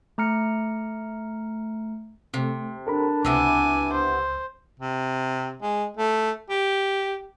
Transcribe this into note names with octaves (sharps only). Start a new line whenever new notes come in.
A3 A#5 F6 C#7
C3 A3 C4
D4 A4 A#4 B5
C#2 C3 B3 E4 G#5 D6 E6
C5
C3
G#3
A3
G4